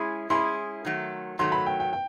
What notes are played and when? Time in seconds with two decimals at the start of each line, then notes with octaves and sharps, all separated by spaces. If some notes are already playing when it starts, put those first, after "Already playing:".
Already playing: G#3 C#4 E4 G#4 C6
0.30 G#3 C#4 E4 G#4 C6
0.85 D#3 F#3 A3
1.39 D#3 F#3 A3 C6
1.52 B5
1.66 G5
1.80 G5
1.93 G5